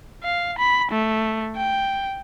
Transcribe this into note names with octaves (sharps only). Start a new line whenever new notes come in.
F5
B5
A3
G5